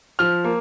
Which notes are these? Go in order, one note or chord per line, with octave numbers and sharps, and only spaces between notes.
F3 F6
A#3